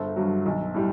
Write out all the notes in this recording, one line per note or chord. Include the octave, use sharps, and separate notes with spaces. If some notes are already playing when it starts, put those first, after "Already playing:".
Already playing: G1 A4 C5
G2 F#3
B1
A2 G3